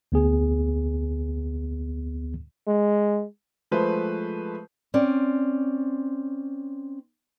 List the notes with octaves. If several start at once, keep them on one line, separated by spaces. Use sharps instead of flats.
D2 B3 G#4
G#3
F3 G#3 A3 B4 C5
C4 C#4 D5